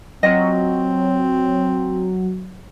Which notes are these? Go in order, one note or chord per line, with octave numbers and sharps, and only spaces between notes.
F#3 C4 F4 D#5